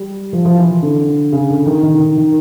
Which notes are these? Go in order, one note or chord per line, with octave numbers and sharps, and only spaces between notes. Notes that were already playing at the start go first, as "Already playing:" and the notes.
Already playing: G3
F3
F3
E3
D3
C#3
D3
D#3
D#3
D#3
D#3